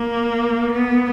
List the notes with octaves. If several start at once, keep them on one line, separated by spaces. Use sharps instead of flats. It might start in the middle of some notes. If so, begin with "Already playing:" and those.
Already playing: A#3
B3